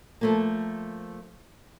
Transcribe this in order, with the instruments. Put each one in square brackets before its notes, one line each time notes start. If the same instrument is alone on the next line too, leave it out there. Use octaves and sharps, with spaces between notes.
[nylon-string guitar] F3 A3 A#3